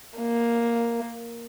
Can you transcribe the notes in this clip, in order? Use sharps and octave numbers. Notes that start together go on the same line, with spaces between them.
A#3